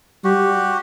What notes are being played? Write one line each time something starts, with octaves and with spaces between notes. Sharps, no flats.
G3 F#4 G4